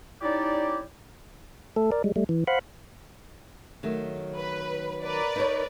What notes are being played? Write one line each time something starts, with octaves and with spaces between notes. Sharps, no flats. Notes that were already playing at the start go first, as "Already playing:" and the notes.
C#4 D#4 E4 G4 D5
A3 A4
A#4 D5
G3 G#3
G3 A3
E3
C5 F5 F#5 B5
D#3 F#3 A3
B4
A#4 B4 D5
D#4 C5 C#5